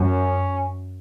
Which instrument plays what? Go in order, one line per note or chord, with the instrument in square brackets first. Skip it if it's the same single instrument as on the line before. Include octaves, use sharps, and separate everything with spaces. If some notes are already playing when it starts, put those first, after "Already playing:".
Already playing: [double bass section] F#2 [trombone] C#4